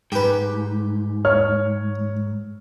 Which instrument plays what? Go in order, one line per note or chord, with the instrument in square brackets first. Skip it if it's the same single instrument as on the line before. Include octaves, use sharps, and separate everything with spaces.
[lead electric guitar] G#2 [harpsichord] G4 B4
[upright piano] C#5 F6